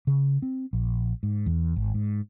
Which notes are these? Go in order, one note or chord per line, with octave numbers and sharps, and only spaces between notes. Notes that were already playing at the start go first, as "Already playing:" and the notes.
C#3
C4
A#1
G#2
E2
G#1
G#2